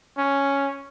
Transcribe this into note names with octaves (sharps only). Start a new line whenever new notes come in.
C#4